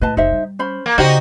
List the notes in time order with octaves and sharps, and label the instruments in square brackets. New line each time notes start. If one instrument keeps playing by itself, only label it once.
[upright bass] A2 [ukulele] B4 D#5 A5
[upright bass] F1 [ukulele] D#4 C5 E5
[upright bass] G3
[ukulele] C#4 C5 B5
[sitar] A#3
[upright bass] C#3 [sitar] D#4 F#4 [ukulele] G4 C5 D5